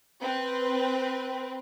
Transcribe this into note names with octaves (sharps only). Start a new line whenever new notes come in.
C4 B4